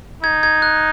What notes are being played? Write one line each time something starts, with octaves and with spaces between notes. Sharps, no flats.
D#4 G#6
G#6
F#6